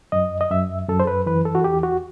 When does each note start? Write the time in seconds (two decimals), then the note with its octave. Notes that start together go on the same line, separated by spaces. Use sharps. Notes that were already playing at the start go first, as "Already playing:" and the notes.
0.12 F#2 D#5
0.41 D#5
0.50 F#2 E5
0.88 F#2 A4
1.00 C5
1.07 B4
1.26 E3 B4
1.45 A4
1.55 F#4
1.64 E2 G4
1.83 F#4